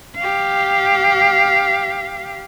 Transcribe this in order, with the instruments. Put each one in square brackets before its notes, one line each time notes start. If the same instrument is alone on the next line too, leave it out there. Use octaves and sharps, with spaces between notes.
[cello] G4 F5